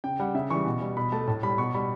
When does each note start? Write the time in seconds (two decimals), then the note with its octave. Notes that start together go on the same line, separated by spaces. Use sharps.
0.04 C#3 G5
0.20 G3 F#5
0.35 C#3 E5
0.50 E3 G3 C#6
0.66 B2
0.81 G3
0.97 B2 B5
1.12 A3 A5
1.28 A2 A5
1.43 G3 B5
1.58 B2 C#6
1.74 G3 B5